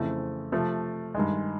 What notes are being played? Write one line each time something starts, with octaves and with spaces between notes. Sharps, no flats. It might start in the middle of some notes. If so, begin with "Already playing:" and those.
Already playing: F2 C#3 E3 A3 C4
C3 F3 A3
G2 D#3 G#3